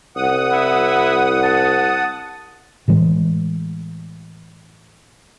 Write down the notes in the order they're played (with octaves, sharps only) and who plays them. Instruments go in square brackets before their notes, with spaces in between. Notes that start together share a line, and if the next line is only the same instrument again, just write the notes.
[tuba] C2 [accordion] F#5 D#6
[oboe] E4
A5
[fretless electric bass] A2 E3 G#3